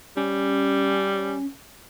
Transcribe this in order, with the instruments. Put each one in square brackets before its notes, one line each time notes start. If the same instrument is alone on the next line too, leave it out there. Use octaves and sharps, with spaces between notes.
[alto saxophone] G3 [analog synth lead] C#4